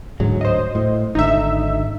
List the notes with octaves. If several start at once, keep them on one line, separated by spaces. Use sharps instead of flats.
D1 D2 G#2 F#3
C5 D#5
A2
G#1 D3 D#4 E5